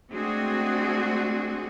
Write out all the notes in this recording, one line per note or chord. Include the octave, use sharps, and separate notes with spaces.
G#3 A3 C4 D4 F#4 G#4